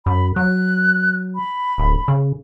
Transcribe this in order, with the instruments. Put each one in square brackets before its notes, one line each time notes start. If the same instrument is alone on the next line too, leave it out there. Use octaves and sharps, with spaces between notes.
[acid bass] F#2 [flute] B5
[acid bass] F#3 [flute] F#6
[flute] B5
[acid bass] D1
C#3